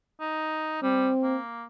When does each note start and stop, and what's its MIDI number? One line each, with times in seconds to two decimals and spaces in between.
0.21 0.81 63
0.83 1.10 55
0.83 1.38 60
1.23 1.65 58